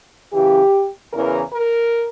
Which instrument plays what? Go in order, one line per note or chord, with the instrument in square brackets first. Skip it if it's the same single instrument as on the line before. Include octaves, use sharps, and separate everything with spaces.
[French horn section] F#2 C#3 E3 G4
E2 C#3 E3 A#4
A#4